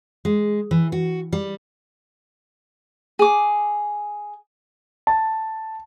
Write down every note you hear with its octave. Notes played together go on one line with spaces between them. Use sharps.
G#3
E3
F#4
G3
G#4 D6
A5